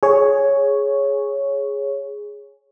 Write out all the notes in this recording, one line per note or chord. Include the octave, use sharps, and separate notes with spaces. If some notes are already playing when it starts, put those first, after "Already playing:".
G#4 C#5